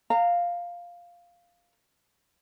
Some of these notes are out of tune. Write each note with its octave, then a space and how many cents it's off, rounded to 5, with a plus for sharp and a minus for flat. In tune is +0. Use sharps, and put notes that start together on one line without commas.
F5 +0 A#5 -25